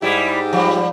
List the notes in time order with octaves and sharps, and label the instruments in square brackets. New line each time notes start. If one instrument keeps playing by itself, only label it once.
[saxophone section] G#2 G4 [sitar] G3 E4
[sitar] F3 G3